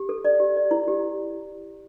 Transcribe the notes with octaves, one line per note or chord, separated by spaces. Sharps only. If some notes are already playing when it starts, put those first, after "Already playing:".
Already playing: G4
A4
D5
G4
D5
E4
G4
E4